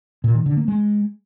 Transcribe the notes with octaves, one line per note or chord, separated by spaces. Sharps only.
A#2
D#3
D3
A#3
G#3